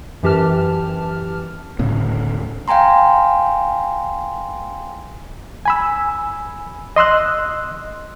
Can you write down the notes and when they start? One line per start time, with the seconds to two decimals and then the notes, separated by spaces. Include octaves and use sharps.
0.23 F#2 E3 G4 A5 F6
1.79 D1 A2 C#3 B3
2.68 F5 G5 G#5 A#5 C6
5.66 G#5 B5 E6
6.96 D#5 C6 E6 F#6